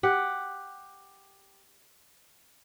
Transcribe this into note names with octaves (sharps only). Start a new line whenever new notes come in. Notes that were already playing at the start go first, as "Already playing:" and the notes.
G4 F#5